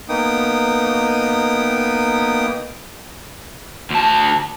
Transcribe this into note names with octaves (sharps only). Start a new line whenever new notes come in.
A#3 B3 D#4 G5 D#6
D2 A5